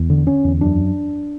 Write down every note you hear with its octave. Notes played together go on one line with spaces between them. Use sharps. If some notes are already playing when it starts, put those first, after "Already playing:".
Already playing: E2
D3
D3 C#4
E2
F#2 D4